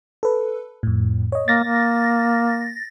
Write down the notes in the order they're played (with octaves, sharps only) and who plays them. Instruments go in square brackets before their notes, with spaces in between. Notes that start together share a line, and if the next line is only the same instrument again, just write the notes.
[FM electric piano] A4 B4
F2 A2
C#5 D#5
[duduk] A#3 [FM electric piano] A6 A#6
[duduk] A#3